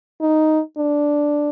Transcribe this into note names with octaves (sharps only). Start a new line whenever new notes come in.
D#4
D4